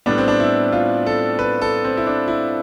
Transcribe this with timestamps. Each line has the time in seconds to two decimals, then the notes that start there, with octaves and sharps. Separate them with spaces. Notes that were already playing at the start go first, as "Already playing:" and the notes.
0.06 A2 G3 B3 D4
0.18 C4
0.28 D4
0.40 E4
0.72 F4
1.06 A4
1.39 B4
1.62 A4
1.84 C4
1.97 E4
2.07 D4
2.28 E4